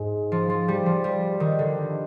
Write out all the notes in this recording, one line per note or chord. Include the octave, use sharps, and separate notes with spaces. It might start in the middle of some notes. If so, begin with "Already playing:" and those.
Already playing: G#2
F3
F3
G3
F3
G3
D#3
D3